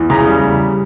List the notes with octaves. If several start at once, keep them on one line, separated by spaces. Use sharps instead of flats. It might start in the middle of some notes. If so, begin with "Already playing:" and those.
Already playing: E2
C#3 A#5
G3
E2